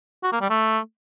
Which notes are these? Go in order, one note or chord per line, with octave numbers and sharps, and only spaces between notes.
F#4
A#3
G3
A3